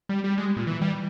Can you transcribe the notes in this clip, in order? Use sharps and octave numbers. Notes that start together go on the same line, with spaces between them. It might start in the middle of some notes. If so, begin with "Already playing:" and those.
G3
G3
G#3
A#2
E3
G3